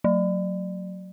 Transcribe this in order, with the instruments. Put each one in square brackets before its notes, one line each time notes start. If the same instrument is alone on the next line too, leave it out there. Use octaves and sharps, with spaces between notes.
[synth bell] F#3